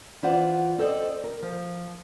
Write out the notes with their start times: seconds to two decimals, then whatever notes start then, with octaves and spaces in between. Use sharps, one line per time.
0.23 E3 F4 C5 D5 F#5
0.78 C4 A4 C5 D5 D#5
1.24 A#4
1.42 F3